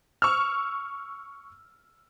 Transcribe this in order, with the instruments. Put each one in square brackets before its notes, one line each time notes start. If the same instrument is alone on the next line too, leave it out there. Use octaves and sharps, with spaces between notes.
[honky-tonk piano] C#6 E6 F6